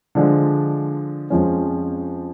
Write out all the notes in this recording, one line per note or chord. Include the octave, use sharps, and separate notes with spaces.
D3 F3 G#3 D4
F2 F3 G#3 C#4